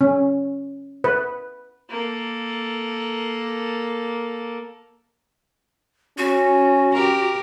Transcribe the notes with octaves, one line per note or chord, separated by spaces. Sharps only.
C#4
B4
A#3 A4
C#4 F#4
G4 A#4